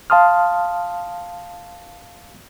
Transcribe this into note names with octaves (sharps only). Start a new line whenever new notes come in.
F5 A5 C6 D#6 F6